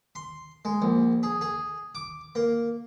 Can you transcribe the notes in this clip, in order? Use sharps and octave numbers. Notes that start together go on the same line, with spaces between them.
C6
G#3
A#1
G#4
G#4
D6
A#3